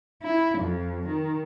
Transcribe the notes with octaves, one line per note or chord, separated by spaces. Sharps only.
E4
F2
D#3